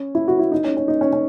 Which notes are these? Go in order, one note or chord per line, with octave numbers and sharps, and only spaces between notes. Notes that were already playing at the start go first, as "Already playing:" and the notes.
Already playing: C#4
E4
F#4
E4
D#4
C#4
C#4
D#4
C#4
C#4